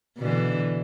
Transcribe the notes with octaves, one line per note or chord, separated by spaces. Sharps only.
B2 D3 E3